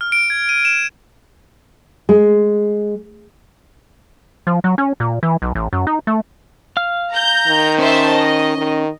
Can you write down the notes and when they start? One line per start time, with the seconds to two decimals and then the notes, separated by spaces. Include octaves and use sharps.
0.01 F6
0.12 D7
0.30 G#6
0.49 D#7
0.65 E7
2.09 G#3
4.47 F3
4.64 F#3
4.78 C#4
5.00 A#2
5.23 E3
5.42 B1
5.55 A1
5.73 F#2
5.87 D#4
6.07 A3
6.77 F5 F6
7.12 A#5 G6
7.47 D#3
7.78 C#4 C5 E5 A5
8.14 D#5
8.58 D#3